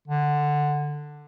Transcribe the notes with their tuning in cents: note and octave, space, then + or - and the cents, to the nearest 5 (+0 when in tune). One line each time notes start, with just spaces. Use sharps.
D3 +10